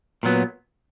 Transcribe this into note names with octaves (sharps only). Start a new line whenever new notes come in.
A#2 F#3 B3